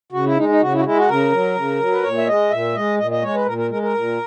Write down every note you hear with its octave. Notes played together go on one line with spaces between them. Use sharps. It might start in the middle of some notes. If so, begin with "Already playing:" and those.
C#3 F#4
E4
G#3 D#4
D#4
C#3 F#4
E4
F#4
G#3 E4
F#4
C#3 A#4
F#3
C#3
F#3
B4
A#2 C#5
E5
G#3 D#5
A#2 E5
G#3 D#5
A#2 D#5
D#5
G#3 C#5
B4
A#2 A#4
A#4
G#3 A#4
A#4
A#2